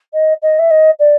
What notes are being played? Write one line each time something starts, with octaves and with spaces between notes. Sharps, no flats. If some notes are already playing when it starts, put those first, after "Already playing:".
D#5
D#5
E5
D#5
D5